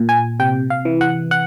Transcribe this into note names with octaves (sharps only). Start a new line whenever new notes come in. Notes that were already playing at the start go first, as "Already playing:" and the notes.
Already playing: A#2
G#5
C3 G5
F5
E3
F#5
F#5